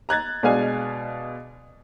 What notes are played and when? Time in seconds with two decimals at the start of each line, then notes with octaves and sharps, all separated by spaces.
0.09 A#5 F#6 G#6 A6
0.43 B2 G#3 D4 F5 G#5